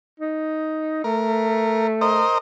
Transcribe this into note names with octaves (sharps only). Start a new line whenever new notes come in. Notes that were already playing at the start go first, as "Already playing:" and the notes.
D#4
A3 A#4
A#4 C5 D#5